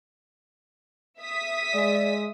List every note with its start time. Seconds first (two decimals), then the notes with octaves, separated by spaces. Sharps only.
1.20 E5 D#6 B6
1.73 G#3 D5